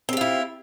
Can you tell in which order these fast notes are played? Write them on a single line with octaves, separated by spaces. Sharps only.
C4 G4 F4 E4